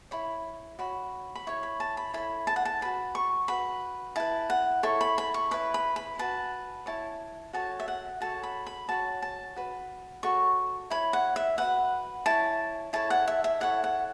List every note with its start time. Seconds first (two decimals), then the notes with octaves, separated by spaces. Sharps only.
0.11 E4 C#5 B5
0.79 F#4 C#5 B5
1.36 B5
1.47 E4 C#5 C#6
1.63 B5
1.80 A5
1.97 B5
2.14 E4 A4 C#5 B5
2.47 A5
2.56 F#5
2.65 A5
2.81 F#4 B4 B5
3.15 C#6
3.48 F#4 B4 B5
4.16 E4 B4 A5
4.50 F#5
4.83 E4 A4 C#5 C#6
5.01 B5
5.18 B5
5.34 C#6
5.51 E4 B4 B5
5.74 B5
5.96 B5
6.19 F#4 B4 A5
6.86 E4 C#5 A5
7.53 F#4 A4 C#5 A5
7.80 E5
7.88 F#5
8.20 F#4 A4 C#5 A5
8.43 B5
8.67 B5
8.89 F#4 C#5 A5
9.22 A5
9.56 F#4 B4
10.23 F#4 A4 C#5 C#6
10.90 E4 C#5 B5
11.13 F#5
11.36 E5
11.58 F#4 B4 F#5
12.26 E4 C#5 A5
12.93 E4 A4 C#5 A5
13.10 F#5
13.28 E5
13.44 E5
13.60 E4 A4 C#5 F#5
13.84 F#5